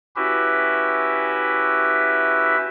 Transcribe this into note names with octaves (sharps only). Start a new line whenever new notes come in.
C#4 E4 F#4 G4 B4 E5